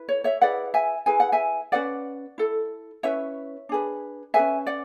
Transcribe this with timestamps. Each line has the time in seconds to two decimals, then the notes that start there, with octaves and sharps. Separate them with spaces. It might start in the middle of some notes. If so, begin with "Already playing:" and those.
Already playing: E4 B4
0.09 C#5
0.24 C#5 E5
0.41 E4 G#4 B4 D5 F#5
0.74 E5 G#5
1.06 E4 G#4 B4 G#5
1.20 F#5
1.32 E5 G#5
1.72 C#4 G#4 B4 D5 F#5
2.38 E4 A4
3.03 C#4 E4 B4 C#5 E5
3.69 D4 G#4 B4
4.34 G#4 B4 E5 G#5
4.39 C#4
4.67 D5 F#5